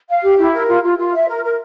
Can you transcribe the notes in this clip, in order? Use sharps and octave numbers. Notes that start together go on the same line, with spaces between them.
F5
G4
E4
A#4
F4
F4
F4
E5
A#4
A#4